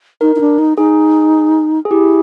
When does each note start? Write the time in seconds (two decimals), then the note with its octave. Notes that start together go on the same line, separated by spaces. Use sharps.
0.21 D#4 A#4
0.36 D#4
0.40 D4
0.59 D#4
0.78 D#4 G#4
1.85 G#4
1.90 E4 G4